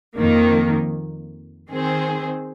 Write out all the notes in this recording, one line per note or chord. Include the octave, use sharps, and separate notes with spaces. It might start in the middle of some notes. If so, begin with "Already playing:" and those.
F2 D#3 A#3
D#3 C4 G#4 C5